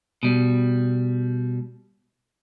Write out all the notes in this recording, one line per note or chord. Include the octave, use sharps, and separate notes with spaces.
B2 G3